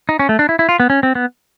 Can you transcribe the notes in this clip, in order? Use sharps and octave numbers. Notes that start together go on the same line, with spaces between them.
D#4
C#4
A3
D4
E4
E4
F4
B3
C#4
C4
B3